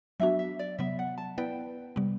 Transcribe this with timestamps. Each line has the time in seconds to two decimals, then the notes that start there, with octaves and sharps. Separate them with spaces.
0.20 F#3 B3 D4 F#4 E5
0.39 E5
0.59 D5
0.79 C3 F#3 B3 E5
0.99 F#5
1.18 A5
1.38 B3 E4 B4 D5 G5
1.96 C3 G3 B3